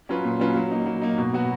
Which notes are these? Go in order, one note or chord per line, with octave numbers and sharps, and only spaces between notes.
F#3 C#4 F4 B4
A#2
F#3 C#4 F4 B4
F#3
A#3 D#4
F#3
A#3 D#4
B2
F#3 B3 F#4